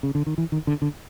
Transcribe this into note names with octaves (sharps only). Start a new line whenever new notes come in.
C#3
D3
D#3
E3
D#3
D3
D3